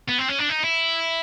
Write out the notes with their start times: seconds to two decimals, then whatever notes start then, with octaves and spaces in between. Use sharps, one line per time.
0.08 B3
0.18 C4
0.28 C#4
0.39 D4
0.49 D#4
0.63 E4